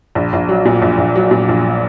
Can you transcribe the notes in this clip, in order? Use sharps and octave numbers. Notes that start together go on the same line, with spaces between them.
A#1
A#1
F#3
A#2
A#1
A#1
F#3
A#2
A#1